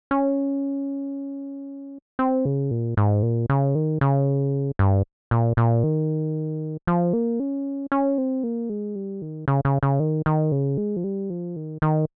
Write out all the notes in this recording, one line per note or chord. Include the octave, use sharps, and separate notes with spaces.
C#4
C4
C#3
A#2
G#2
A#2
C#3
D#3
C#3
G2
A#2
A#2
D#3
F3
A#3
C#4
C#4
C4
A#3
G#3
G3
D#3
C#3
C#3
C#3
D#3
D#3
C#3
G#3
F3
G3
F3
D#3
D#3